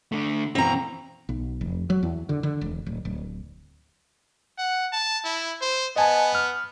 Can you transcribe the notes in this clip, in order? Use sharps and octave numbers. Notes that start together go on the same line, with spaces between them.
D3 A3
B2 E3 C4 A#5
B1
F1
F#3
E2
D3
D3
E1
D1
D1
F#5
A5
E4
C5
B3 D#5 G#5 A5
F6